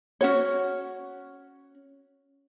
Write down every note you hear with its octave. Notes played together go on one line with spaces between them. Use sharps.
C#4 F#4 C#5